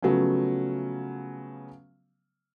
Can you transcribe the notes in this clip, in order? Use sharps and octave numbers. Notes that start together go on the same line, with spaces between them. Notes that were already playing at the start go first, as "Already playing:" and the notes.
C#3 F3 F#3 A3 B3 C#4